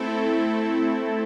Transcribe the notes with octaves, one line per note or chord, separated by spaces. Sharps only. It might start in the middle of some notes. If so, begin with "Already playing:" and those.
Already playing: A3 C4 E4 A4